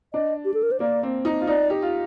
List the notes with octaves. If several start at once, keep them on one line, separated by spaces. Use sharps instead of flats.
D4 D#5
G4
A4
A#4
C5
A#3 D5
C4
D#4
F4
D#4 D5
G4
F4